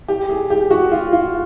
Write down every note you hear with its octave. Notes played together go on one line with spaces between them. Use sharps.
G4
G#4
G4
F#4
F4
F4